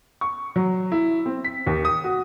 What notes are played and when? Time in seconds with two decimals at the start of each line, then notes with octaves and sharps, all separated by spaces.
0.21 C#6
0.56 F#3
0.92 E4
1.26 C4
1.44 B6
1.67 D#2
1.85 D#6
2.04 F#4